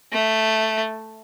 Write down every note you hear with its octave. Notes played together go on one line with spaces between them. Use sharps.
A3